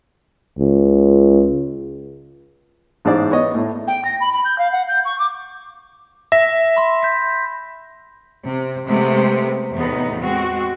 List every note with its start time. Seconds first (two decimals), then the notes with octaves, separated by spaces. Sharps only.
0.59 C#2
3.05 A1 G#2 G#3 G#4 C5 D5
3.31 B3 C#5 D#5
3.55 A2
3.87 G5
4.05 A#6
4.20 B5
4.33 B5
4.45 G6
4.58 F5
4.71 F#5
4.88 G6
5.05 C#6
5.19 D6
6.32 E5 A#6
6.77 B5 C6
7.03 G6 B6
8.44 C3
8.86 C3 G#3 A3 B3
9.72 E2 A2 C3 B3 D#4
10.20 G#3 C4 F#4